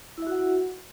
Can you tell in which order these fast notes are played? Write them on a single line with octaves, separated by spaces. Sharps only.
E4 E5 F#4 F#5